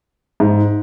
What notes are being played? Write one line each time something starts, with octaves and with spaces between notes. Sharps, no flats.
G#2